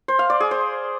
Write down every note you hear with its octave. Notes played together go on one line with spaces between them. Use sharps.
C5
F5
D5
G#4
C5